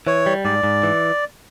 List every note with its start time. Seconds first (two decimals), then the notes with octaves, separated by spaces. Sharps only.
0.07 E3 C#5
0.26 G3
0.45 G#2 D5
0.63 G#2
0.83 E3